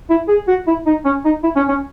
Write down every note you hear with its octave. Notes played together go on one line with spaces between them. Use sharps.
E4
G#4
F#4
E4
D#4
C#4
D#4
E4
C#4
C#4